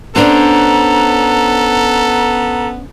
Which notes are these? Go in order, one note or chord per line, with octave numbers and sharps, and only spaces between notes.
B3 C#4 D4 A4 C5 A#5